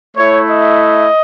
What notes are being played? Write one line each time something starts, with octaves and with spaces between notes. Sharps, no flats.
A3 E4 C#5
D#5